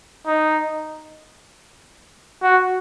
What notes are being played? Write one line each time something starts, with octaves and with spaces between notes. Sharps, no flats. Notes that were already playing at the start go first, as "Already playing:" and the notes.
D#4
F#4